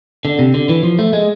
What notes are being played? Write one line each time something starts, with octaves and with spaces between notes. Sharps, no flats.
D3
C3
D3
E3
F3
A3
G#3